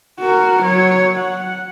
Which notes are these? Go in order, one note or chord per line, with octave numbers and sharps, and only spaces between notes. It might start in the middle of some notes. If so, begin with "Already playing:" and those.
F#4 A#4
F#3 C#5
F#5